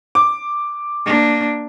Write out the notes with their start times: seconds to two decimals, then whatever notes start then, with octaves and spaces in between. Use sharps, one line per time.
0.15 D6
1.06 A#3 D4